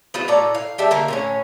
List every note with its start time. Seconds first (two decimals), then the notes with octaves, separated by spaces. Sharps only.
0.14 B3 F4 F#4
0.28 A2 A4 D5 A#5
0.54 F5
0.78 G3 G4 E5 A5
0.91 D3 A#3 A#4
1.08 A2 C#4 C#5